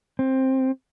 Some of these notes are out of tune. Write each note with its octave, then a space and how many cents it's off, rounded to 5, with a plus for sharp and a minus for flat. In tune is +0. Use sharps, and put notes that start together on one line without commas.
C4 +10